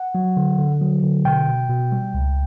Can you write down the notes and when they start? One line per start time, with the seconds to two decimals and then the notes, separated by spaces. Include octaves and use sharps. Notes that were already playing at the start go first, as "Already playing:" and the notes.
Already playing: F#5
0.15 F#3
0.37 D3
0.58 D3
0.81 F#3
1.03 D3
1.25 B2 G5
1.48 B2
1.69 B2
1.92 G3
2.14 C#2